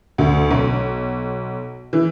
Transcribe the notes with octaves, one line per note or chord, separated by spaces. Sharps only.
D2
B1
E3